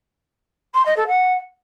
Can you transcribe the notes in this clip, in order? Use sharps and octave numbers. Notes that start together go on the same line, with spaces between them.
C6
D#5
A4
F#5